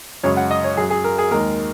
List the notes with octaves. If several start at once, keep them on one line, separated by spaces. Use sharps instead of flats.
F#2 C#3 G#3 C#5
F#5
D#5
C#5
F#2 F#3 G#4
G#4
A#4
G#4
D#2 D#3 G#3 A#4